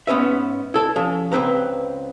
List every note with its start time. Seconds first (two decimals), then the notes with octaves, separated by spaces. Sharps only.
0.07 G#2 B3 C#4 B4 E5
0.74 E4 A4 A5
0.96 F3 C#4
1.32 C#2 A#2 C4 B4 A#5